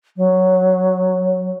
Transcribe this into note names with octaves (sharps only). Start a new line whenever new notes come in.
F#3